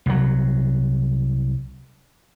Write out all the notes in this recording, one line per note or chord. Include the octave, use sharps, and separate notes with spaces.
C2 F#3